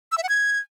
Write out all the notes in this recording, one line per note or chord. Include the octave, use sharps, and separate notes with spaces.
E6
E5
F#5
G#6